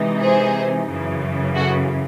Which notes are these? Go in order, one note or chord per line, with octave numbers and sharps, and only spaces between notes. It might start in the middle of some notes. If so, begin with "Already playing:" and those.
Already playing: C3 E3 G#3 D#4
G#4 C5
F#2 C#3 E3
F#4 A4